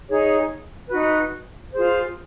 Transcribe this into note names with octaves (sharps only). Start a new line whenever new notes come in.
D#4 G#4 C#5
D#4 F#4 B4
F4 G#4 C5